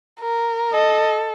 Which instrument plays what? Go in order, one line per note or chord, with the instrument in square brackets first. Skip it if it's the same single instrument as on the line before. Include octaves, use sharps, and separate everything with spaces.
[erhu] A#4
[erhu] A4 [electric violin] D#5